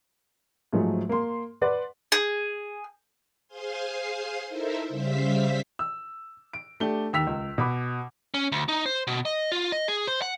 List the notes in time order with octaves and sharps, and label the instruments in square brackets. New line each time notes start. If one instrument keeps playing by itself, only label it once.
[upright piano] G#2 F3 F#3 G#3 A3
A#3 C6
B4 D5 F#5 C6
[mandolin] G#4
[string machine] G#4 C5 F5 G#5 C6
D#4 E4 A4 A#4 C5 E5
C#3 G3 C5 E5 F5 B6
[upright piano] E6
D7
A3 D4 G4 G7
D#2 E6 B6 F7
C#2
B2 F#5 B5 D6
[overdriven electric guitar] C#4
D2
D#4
C5
B2
D#5
F4
D#5
G#4
C5
F#5